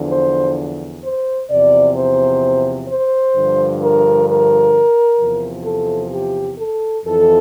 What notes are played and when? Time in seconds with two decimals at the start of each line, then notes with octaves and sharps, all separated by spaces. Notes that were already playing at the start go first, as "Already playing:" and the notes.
Already playing: E2 D3 F3
0.11 C5
1.03 C5
1.50 E2 C3 F3 D5
1.95 C5
2.88 C5
3.34 G2 D3 F3
3.81 A#4
4.27 A#4
5.19 E2 C3 F3
5.65 A4
6.12 G4
6.57 A4
7.04 F2 E3 A4